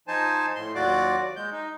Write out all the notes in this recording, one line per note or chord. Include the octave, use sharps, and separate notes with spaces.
F3 D#4 C5 G#5 A5
A2 C6
D#2 F#3 F4 F#4 D5 D6
G#3 G6
D#4